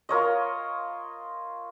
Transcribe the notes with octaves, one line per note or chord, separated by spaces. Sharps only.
F4 A#4 C#5 D#5